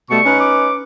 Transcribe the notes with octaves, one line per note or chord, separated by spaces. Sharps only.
B2 G3 A3 C#6
C#4 D#4 B4
D6